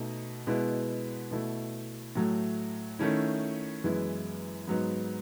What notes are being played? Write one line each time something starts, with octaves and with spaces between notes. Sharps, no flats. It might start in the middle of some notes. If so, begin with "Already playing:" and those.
Already playing: B2 A3 D#4
B2 G#3 B3 E4
B2 A3 E4
A2 F#3 A3
D#3 A3 C#4 E4
F#2 E3 G#3 B3 E4
G#2 F#3 B3 D#4